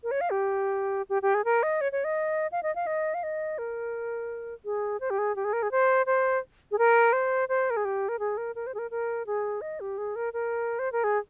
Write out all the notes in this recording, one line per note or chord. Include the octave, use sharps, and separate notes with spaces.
A#4
C#5
F5
G4
G4
G4
G#4
A#4
D#5
C#5
C#5
D#5
F5
D#5
F5
D#5
F5
D#5
A#4
G#4
C5
G4
G#4
G4
G#4
A#4
G#4
C5
C5
G#4
A#4
C5
C5
A#4
G#4
G4
A#4
G#4
A#4
A#4
C5
G#4
A#4
A#4
G#4
D#5
G4
G#4
A#4
A#4
C5
A#4
G#4